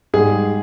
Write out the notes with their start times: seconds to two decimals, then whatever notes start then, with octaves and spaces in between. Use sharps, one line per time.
0.14 G#2 G3 G#4